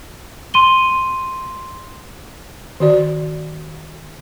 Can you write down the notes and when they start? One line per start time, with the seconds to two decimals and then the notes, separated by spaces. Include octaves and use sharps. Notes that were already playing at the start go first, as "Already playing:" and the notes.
0.54 C6 D#7 G7
2.80 D#3 F#4 D5